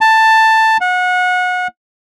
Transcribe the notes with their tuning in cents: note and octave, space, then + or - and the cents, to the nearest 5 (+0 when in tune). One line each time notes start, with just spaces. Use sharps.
A5 +10
F#5 -30